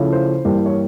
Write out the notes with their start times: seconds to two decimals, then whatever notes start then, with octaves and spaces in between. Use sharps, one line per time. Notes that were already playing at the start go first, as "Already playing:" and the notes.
Already playing: C#3 F3 A3 C#4 E4
0.13 C5
0.45 G2 E3 G3 A#3
0.66 C#5